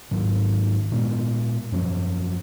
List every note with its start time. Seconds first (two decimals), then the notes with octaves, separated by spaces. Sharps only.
0.11 G#2 D#3 F#3
0.92 A#2 G#3 B3
1.72 F#2 F3 A#3 C#4